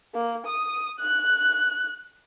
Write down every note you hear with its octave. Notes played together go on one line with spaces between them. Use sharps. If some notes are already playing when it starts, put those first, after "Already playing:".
A#3
D#6
F#6